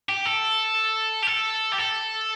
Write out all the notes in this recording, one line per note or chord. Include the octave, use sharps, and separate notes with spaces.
G4
A4
G4
A4
G4
A4